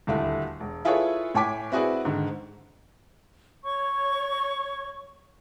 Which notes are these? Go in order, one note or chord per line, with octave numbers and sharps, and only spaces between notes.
D#1 D2 A3 E4
E1
E4 F4 G#4 A4 B4 C#5
A2 C#5 G5 G#5 D6 B6
C4 E4 F#4 G#4 B4 D5
G#2 D3 D#3
C#5 C#6 G#6